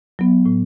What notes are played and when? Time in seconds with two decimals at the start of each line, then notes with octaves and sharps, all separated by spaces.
0.19 F#3 B3
0.46 A2